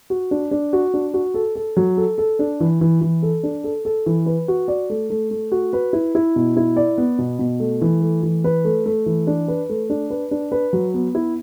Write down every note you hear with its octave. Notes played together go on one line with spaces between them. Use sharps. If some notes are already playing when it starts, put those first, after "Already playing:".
F#4
D4
D4
F#4
D4
F#4
A4
A4
F#3
A4
A4
D4
E3
E3
E3
A4
D4
A4
A4
E3
B4
F#4
D5
A3
A3
A3
F#4
B4
E4
E4
B2
E4
D5
B3
B2
B2
A3
E3
A3
E3
B4
A3
A3
E3
D4
B4
A3
D4
B4
D4
B4
F#3
B3
E4